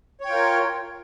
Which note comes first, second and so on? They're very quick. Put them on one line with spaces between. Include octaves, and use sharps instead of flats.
C#5 G5 F4 A#4